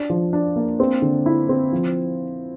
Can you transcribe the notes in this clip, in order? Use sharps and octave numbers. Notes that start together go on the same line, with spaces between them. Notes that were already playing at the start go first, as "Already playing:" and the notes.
Already playing: D4
F3
D4
A#3
C4
D3
E4
C4
F3